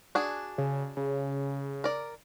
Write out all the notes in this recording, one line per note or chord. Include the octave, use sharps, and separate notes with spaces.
D4 F#4 G#4
C#3
C#3
A#4 D5